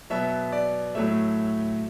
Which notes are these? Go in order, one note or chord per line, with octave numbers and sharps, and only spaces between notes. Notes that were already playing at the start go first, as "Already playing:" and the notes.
B2 F#3 B3 E5
D5
A2 F#3 A3 E5